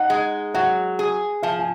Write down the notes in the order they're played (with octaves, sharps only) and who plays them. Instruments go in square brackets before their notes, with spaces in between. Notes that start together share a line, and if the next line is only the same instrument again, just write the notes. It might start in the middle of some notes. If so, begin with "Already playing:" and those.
Already playing: [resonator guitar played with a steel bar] D#4 [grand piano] F#5
[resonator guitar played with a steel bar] G#3
[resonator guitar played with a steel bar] F#3 [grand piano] F#5
[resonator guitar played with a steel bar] G#4
[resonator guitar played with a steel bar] F3 [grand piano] F5
[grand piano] G#5